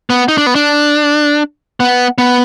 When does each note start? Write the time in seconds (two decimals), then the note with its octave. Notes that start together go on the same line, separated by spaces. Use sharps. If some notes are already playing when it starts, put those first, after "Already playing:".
0.10 B3
0.28 D#4
0.38 D4
0.47 B3
0.55 D4
1.80 B3
2.18 B3